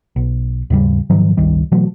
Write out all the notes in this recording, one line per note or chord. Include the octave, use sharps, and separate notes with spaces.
B1
D#2 G#2 C#3 G3
G#2 D#3 F3 F#3
G1 C#2 D#3 G3
B2 E3 F#3 A3